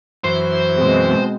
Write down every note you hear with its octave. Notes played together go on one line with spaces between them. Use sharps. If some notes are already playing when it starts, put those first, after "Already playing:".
F#2 E3 C5
B2 G#3 C4